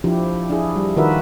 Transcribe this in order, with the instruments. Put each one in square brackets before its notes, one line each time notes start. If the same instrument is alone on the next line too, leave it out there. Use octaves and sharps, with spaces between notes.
[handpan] F3 D4 E4 G4
D4 E4 G#4
G3
D#3 F4 F#4 A#4 B4 E5